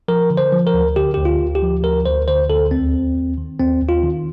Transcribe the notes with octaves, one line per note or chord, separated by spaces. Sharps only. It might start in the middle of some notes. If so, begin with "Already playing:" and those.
F3 A#4
D3
C5
F3
A#4
D2
D3 G4
D2 G4
F4
D2
G4
F3
D2 A#4
D2 C5
D3 C5
D2 A4
D#2 C4
D#2
D#2
D#3
D#2 C4
D#2
F4
D#3